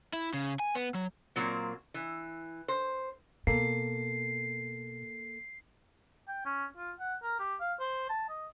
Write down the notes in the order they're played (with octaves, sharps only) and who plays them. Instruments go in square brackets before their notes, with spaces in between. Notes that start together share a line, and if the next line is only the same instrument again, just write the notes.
[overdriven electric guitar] E4
C#3
G#5
B3
F#3
[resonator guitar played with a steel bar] A#2 F#3 A#3 C4
E3
C5
[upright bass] B2 [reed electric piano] A#3 A4 [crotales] C7
[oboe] G5
C#4
F4
F#5
A#4
G4
F5
C5
A5
D#5